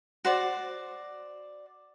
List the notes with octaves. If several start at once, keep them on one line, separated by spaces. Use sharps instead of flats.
F#4 C5 D5